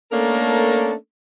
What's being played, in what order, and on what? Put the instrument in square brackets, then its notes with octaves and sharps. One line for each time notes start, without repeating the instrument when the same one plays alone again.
[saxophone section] A3 A#3 C#4 D4 A4 A#4